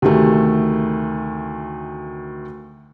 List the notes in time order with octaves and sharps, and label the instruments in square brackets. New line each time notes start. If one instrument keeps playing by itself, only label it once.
[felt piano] D2 C3 D#3 A3